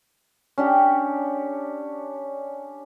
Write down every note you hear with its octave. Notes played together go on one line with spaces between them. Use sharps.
C#4 D4 G4